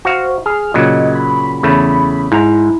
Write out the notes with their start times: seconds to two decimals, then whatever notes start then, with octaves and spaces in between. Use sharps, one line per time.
0.05 F#4 C5 F5
0.46 G#4 F6
0.74 A#2 C#3 F#3 D#5
1.15 B5
1.63 E2 C#3 A3
2.32 G#2 E4 A#5